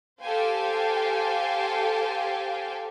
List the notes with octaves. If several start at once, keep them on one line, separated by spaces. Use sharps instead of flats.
G4 A4 C5 F5 G5 G#5